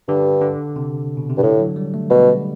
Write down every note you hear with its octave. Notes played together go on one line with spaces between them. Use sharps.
G2 D3
D3
C3
B2
C3
G2
A2 D3
F#3
G3
A3
B2 G3